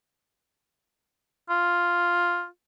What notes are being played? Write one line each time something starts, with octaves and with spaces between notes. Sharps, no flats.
F4